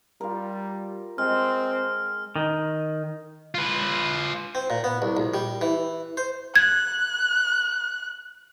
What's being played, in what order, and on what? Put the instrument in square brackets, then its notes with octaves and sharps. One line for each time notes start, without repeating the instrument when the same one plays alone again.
[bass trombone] G3 [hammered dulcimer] F4 A#4
[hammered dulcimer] G#3 [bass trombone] C4 [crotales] F6
[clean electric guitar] D#3
[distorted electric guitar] F4 B4
[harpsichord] C4
A#2
B3
C2
A#1
G3
E3
C5
[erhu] F#6 [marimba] G#6